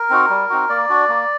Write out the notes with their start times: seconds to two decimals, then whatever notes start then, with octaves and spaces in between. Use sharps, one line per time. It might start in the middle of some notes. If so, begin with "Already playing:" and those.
Already playing: A#4
0.10 C4 D#4 F#4
0.30 G3
0.50 C4 D#4 F#4
0.69 A#3 D5
0.89 D4 F#4
1.09 A#3